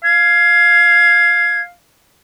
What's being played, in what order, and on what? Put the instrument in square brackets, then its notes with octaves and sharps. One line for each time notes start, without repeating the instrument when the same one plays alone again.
[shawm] F5 [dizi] G#6